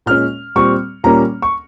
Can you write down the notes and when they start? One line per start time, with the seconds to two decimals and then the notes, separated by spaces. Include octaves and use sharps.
0.06 A#2 G#3 C#4 F6
0.55 A#2 G3 C4 C#6
1.04 A#2 G3 A#3 C#4 A#5
1.42 C#6